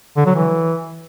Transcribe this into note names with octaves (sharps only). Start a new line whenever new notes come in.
D3
F#3
E3